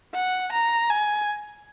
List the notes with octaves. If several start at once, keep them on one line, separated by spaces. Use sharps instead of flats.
F#5
A#5
G#5